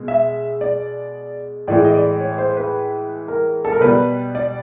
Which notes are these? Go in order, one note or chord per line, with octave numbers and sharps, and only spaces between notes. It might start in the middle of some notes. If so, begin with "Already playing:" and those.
Already playing: B2 G#3
E5
D5
A2 E3 G#3 D5
D#5
D5
C#5
C5
B4
A#4
A4
A#4
B2 G3 B4
D5